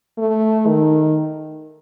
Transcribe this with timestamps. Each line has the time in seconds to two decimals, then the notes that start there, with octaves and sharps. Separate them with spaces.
0.18 A3
0.67 D#3